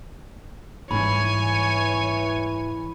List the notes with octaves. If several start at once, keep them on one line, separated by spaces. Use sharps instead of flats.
G#2 E3 G3 C#5 G#5 B5